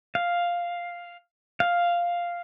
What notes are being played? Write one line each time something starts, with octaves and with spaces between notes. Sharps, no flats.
F5
F5